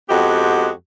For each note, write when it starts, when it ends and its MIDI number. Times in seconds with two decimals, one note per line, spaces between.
0.10 0.70 41
0.10 0.70 56
0.10 0.70 59
0.10 0.70 66
0.10 0.70 67